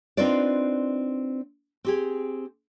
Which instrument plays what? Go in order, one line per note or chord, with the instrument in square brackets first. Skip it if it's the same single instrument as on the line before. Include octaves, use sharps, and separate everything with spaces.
[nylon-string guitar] C4 D4 D#4 F4 B4 D5
C4 G4 G#4